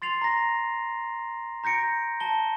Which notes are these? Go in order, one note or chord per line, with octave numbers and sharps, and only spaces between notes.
C6 A6 C7 F7
A#5 A#6
A#5 G6 A#6 C#7 D7
A5 G7